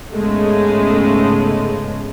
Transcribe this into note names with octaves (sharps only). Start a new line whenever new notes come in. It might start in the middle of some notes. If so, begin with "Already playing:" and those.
G#2 C#3 G#3 A3 B3